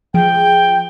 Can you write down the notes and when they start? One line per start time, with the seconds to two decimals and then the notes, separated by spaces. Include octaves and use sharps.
0.14 F3 G#4 G5 D7